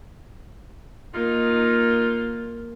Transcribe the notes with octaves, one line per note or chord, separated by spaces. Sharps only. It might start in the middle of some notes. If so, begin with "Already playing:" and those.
A#3 D#4 F4